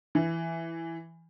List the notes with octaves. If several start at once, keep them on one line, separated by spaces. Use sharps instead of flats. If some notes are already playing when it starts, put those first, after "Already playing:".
E3